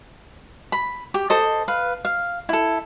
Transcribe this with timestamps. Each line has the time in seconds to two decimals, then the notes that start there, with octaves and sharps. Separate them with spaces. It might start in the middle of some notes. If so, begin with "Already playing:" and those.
0.72 B5
1.14 G4
1.30 A4 C5 D#5
1.68 B4 F5
2.05 F5
2.49 E4 A4